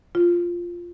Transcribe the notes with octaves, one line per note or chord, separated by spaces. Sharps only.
F4